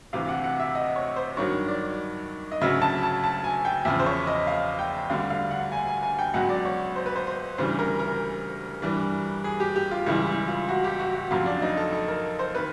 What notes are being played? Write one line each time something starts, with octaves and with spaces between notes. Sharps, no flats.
D2 C3 E3 F5
F#5
F#5
E5
D#5
C#5
C5
G2 D#3 F#3 C#5
D5
D#5
D2 C#3 F#3 E5
A5
A5
A5
G#5
G5
E2 C#3 F3 E5
C5
C#5
D#5
F5
G5
D2 D3 G3 F5
F5
F#5
G#5
G#5
G#5
G5
C#2 B2 F#3 F#5
D5
C#5
C5
B4
C5
C5
D2 C#3 E3 G3 C5
A#4
A#4
G2 E3 G3
G#4
G4
G4
F4
C#2 C#3 E3 G3 E4
E4
F4
F#4
G4
F#4
F#4
F2 C#3 F#3 F4
D4
D#4
A4
A4
A#4
C5
D#3 B4